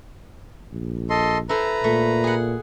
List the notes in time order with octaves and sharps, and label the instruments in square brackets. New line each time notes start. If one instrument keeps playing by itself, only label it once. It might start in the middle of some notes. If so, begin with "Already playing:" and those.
[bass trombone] A#1
[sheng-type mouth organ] A4 D#5 C6
[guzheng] E4 A4 C5 [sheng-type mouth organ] B4 A#5
[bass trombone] A#2 [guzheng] A3
[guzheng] G#4 F#5